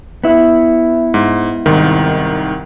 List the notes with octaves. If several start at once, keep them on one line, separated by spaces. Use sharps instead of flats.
B3 E4
G#2
C2 G#2 D#3